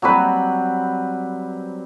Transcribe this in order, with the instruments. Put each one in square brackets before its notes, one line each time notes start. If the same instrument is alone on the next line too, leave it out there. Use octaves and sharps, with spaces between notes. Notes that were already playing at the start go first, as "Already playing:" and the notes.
[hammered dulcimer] F#3 G3 C4 B4